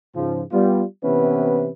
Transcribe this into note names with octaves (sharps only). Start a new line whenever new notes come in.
G#2 C#3 F3
G3 B3 F4
C3 E3 B3 C#4 E4 B4